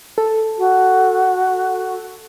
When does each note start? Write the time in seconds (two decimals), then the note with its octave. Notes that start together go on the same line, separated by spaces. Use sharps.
0.18 A4
0.59 F#4